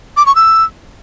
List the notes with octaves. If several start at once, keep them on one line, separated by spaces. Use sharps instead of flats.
D6
C#6
E6